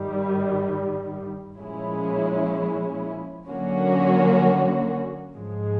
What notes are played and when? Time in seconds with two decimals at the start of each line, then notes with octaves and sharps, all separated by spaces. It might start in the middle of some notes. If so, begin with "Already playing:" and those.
Already playing: G2 D#3 G3
1.59 A#2 F3 G#3 C#4 E4
3.48 D3 F#3 A#3 C#4 F#4
5.35 G#2 F3 G#3